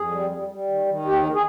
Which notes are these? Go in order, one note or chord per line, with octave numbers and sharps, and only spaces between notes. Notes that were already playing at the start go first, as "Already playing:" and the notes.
Already playing: F2 G#4
G3
G3
G3
D#3
D#3
D#2 G4
G#4